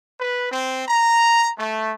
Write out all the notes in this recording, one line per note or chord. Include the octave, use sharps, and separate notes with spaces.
B4
C4
A#5
A3